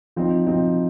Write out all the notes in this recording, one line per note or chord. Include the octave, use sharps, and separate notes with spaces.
F3 C4 D#4
F3 C4 D#4